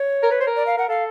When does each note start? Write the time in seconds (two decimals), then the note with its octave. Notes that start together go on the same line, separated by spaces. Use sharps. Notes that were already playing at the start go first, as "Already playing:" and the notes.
Already playing: C#5
0.23 A#4
0.31 B4
0.40 C5
0.47 A#4
0.56 D5
0.66 F5
0.77 A#4 F#5
0.89 A4 F5